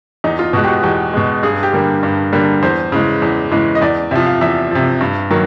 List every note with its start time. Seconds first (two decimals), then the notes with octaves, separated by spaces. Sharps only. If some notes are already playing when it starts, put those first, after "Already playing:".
0.24 E2 D#4
0.39 F4
0.53 B2 G#3 F#4
0.64 G4
0.69 F#4
0.83 E2 G4
1.14 B2 G#3
1.43 G2 G#4
1.63 G4
1.73 D3 G3 A#3
2.03 G2
2.32 D3 G3 A#3
2.63 E2 C5
2.92 C#3 E3 G#3
3.22 E2
3.51 C#3 E3 G#3
3.75 D#5
3.81 E2 D5
4.11 C3 F3 E5
4.26 F5
4.41 E2 E5
4.71 C3 F3
5.01 G2
5.30 D#3 F#3 A#3